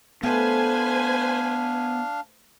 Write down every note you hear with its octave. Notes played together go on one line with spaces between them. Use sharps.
A3 B3 D4 B4 C5 F5 G#5